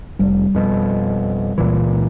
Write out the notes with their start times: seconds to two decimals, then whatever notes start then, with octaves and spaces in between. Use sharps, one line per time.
0.19 F1 G3
0.55 F2 B2
1.58 C#2 A#2 E3